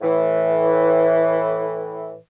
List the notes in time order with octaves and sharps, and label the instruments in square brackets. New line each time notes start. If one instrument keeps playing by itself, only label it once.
[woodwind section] A2 E3